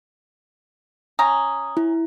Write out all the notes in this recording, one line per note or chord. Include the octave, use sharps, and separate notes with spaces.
C#4 G5 A#5 D#6
E4